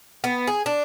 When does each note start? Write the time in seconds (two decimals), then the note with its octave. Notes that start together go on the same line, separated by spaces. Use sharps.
0.24 B3
0.47 G#4
0.66 D4